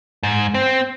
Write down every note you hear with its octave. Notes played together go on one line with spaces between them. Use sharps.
G#2
C4